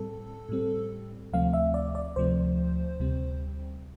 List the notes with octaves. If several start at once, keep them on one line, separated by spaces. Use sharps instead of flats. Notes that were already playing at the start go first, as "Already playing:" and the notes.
Already playing: A2 G3 C4 A4
A2 G3 C4
D2 C3 F3 A3 C4 F5
E5
D5
D5
D2 C3 F3 A3 C4 C5
D2 C3 G3 C4